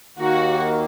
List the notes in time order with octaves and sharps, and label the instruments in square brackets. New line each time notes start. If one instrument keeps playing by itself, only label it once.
[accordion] D#2 D#3 A#3 [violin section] F#4